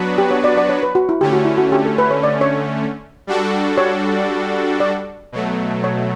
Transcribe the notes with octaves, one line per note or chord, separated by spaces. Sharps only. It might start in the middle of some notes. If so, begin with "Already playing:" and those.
Already playing: F#3 B3 D4 F#4 B4
G4
C#5
D5
D5
C#5
B4
F#4
E4
D3 A3 C#4 G4
F#4
E4
F#4
G4
A4
B4
C#5
D5
C#5
G3 D4 F#4 A4
C#5
D5
B2 F#3 A3
C#5